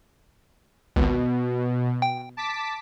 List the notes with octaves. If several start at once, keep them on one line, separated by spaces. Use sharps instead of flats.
G#1 C#2 B2
G5
A5 D6 B6